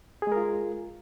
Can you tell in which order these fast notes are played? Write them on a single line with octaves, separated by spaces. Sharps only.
G#4 G#3 A#4 F4